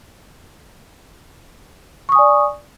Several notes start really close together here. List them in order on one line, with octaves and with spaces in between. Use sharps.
C#6 D#6 G#5 D5